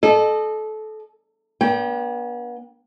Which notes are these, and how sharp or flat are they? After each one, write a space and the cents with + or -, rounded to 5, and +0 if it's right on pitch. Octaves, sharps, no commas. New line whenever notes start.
A4 -25 D#5 -35
B3 -40 D4 -20 G5 +0